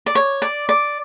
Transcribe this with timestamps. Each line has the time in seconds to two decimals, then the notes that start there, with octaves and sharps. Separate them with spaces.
0.06 D5
0.15 C#5
0.42 D5
0.69 D5